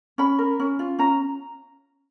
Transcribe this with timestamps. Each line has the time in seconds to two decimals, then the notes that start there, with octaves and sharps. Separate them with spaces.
0.18 C#4 B5
0.39 A#4
0.60 C#4
0.79 F4
0.99 C#4 A#5